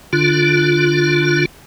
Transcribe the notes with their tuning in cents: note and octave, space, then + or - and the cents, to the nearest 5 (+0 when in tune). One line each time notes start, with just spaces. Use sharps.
D3 +0 D4 +0 F4 +0